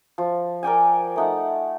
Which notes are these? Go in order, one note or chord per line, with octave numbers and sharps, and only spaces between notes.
F3
A#4 D5 G5 G#5
A3 D#4 F#5